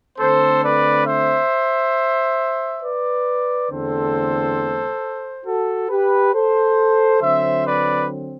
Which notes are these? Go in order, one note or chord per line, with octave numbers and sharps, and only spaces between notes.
D3 A3 C4 A4 C5
B4 D5
C5 E5
B4 D5
E2 D3 A3 C4 A4 C5
F#4 A4
G4 B4
A4 C5
D3 F#3 C4 C5 E5
B4 D5